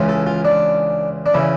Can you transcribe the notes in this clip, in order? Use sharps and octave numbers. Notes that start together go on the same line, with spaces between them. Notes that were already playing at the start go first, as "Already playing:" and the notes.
Already playing: C#2 C#3 E3
A4
F4
D4
D4
C#3 E3 E4